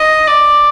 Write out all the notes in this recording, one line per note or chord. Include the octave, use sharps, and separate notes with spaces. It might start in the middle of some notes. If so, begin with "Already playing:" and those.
Already playing: D#5
D5